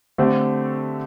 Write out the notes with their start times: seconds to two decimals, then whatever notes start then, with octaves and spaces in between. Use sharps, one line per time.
0.18 D3 A3 C4 G4